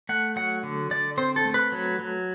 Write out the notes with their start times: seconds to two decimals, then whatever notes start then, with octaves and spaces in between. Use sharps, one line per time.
0.09 A3 F#5
0.36 F#3 F#5
0.63 D3
0.91 D3 D5
1.18 C4 C5
1.36 A4
1.45 A3
1.54 B4
1.72 F#3
1.99 F#3